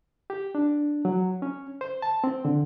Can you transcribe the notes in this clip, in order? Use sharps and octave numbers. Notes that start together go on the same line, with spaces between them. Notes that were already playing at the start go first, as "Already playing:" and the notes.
G4
D4
F#3
C#4
C5
A5
C4
D3